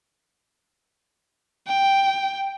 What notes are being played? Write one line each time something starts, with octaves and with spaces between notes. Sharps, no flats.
G5